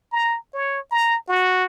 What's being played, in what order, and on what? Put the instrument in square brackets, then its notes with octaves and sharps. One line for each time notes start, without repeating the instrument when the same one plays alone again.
[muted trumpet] A#5
C#5
A#5
F#4